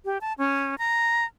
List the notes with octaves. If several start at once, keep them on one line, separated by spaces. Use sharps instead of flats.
G4
A5
C#4
A#5